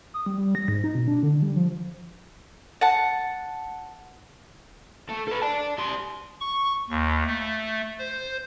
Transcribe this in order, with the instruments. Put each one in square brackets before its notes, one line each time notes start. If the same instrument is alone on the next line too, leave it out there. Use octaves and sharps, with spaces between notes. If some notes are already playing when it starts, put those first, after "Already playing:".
[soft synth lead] D#6
G3
G3
A#6
G#2
D#4
B2
D4
D3
G3
F3
[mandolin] F#5 A5
[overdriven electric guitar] A3
A4 B4
D5 A5
G3 C6
[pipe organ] C#6
D#2
A3
C5